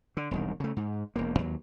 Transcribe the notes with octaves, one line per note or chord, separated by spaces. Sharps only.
D3
E1 C2 D#3
C#3 A3
G#2
E1 E2 A#3
D#2 F#3